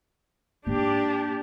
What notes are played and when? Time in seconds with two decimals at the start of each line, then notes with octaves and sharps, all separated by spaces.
0.66 G#2 A#3 D4 G4